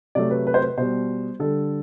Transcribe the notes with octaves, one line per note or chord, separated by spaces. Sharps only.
C3 F#3 A3 D5
B4
B4
C5
B4
B2 G3 C5
D3 G3 A4